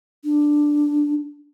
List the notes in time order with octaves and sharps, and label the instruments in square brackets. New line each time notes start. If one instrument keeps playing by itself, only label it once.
[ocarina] D4